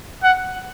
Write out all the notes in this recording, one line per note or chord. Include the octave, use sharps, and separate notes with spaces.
F#5